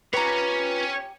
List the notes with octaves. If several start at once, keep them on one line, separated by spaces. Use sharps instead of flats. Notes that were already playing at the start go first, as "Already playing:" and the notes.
C#4 F4 G4 B4 C#5 A#5